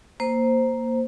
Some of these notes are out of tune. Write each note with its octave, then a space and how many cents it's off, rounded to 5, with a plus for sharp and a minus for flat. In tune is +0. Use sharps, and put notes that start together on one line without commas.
A#3 +0 C5 +0